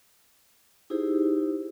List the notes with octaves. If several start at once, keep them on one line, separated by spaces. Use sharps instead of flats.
D#4 E4 G4 G#4 C5